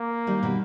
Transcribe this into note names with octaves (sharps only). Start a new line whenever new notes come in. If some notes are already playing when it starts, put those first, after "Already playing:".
Already playing: A#3
D#3 G3
B2 D#3